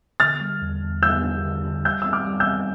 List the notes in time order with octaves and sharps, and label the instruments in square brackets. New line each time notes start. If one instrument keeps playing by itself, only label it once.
[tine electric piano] D3 [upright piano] F6 A6
[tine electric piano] G3
E2
E2
[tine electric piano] G3 [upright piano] E6 G6
[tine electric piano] D4
D3
D3
[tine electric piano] G3 [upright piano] E6 G6
[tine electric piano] C4 [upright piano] E6
[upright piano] D6 F6
[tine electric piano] G3
[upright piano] E6 G6
[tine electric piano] C4